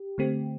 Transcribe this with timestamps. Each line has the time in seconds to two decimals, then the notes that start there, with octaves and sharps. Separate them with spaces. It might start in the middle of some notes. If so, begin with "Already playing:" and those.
Already playing: G4
0.18 D3 A3 C4 G4